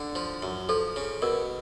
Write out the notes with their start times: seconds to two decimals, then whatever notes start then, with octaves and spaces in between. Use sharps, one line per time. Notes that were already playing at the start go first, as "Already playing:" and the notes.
Already playing: D3
0.15 F3
0.42 F#2
0.69 F3 A4
0.96 C#3
1.22 B2 A#4